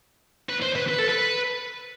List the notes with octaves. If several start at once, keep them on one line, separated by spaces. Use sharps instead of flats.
B4
C5
B4
B4
A4
B4